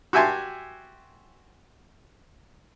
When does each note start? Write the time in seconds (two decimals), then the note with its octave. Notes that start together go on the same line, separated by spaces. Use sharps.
0.13 F#4 G4 E5 G#5 A5 C6